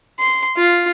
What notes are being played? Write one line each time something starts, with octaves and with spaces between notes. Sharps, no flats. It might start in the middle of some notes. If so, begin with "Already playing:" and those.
C6
F4